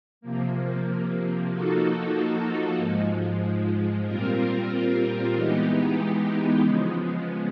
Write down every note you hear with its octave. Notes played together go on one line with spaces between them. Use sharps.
C3 F3 A#3
F3 A#3 D#4 F#4 A4
G#2 F3 G#3
A#2 G3 C4 F4 A#4
E3 G#3 B3 D#4 G4
C#3 F3 G#3 B3